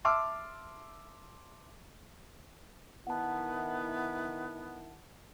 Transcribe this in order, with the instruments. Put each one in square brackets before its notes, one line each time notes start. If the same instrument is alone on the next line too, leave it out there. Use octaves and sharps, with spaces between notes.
[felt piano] E5 A5 C6 D6 E6 F6
[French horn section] D#3 E4 [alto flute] B3 [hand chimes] F#5 A5